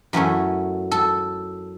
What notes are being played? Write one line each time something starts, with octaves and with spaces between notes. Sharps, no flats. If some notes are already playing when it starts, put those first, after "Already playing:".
F#2 E3 A3 C#4
A4